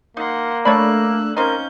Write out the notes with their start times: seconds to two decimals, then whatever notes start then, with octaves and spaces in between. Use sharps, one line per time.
0.17 A#3 D#4 F#5 C6
0.65 A3 D4 C#5 D5 B5 E6 F#6
1.37 A#3 C4 C#4 D#4 A#4 G6